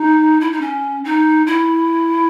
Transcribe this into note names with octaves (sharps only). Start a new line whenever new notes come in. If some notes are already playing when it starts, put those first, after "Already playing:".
Already playing: D#4
E4
D#4
C#4
D#4
E4